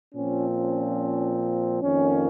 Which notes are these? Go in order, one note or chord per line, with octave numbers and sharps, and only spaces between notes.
A#2 F3 C4 C#4
C#4
F2 D#3 A#3 C#4